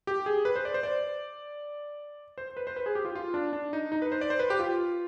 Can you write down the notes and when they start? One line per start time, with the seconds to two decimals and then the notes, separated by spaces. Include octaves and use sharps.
0.07 G4
0.26 G#4
0.45 B4
0.56 C5
0.65 D5
0.74 C5
0.83 D5
2.38 C5
2.57 B4
2.67 C5
2.76 B4
2.86 G#4
2.95 G4
3.05 F4
3.15 F4
3.34 D4
3.53 D4
3.73 D#4
3.92 D#4
4.02 B4
4.12 C5
4.21 D5
4.30 C5
4.39 B4
4.50 G4
4.59 F4